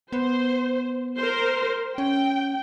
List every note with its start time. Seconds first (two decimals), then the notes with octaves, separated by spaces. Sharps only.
0.12 B3 C5
1.18 A#4 C5
1.98 C#4 G5